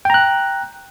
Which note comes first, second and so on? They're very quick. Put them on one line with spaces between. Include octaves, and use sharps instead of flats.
G5 A#5 F#6